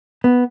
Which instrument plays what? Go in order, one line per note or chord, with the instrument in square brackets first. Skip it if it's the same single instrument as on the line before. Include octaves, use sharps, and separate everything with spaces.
[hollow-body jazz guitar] B3